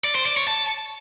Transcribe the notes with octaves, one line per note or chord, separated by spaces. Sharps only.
D5
C5
D5
C#5
A5